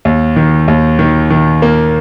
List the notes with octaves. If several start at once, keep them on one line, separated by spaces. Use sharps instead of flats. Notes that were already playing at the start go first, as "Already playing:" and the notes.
D#2
D#3
D#2
D#3
D#3
A#3